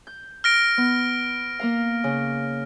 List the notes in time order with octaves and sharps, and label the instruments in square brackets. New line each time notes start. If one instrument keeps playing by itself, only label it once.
[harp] G6
[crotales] F6 A#6 D7
[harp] B3
A#3 A#4 F5
C#3